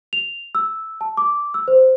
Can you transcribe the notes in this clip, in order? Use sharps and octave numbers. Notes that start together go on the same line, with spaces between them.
F7
E6
A5
D6
E6
C5